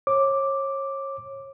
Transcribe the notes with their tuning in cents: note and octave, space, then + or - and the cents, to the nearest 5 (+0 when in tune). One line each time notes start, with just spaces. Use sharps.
C#5 -30 D6 +0